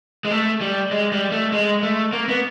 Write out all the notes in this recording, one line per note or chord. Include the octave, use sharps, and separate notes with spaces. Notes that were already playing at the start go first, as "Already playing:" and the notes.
G#3
A3
G3
G#3
G3
A3
G#3
A3
A#3
B3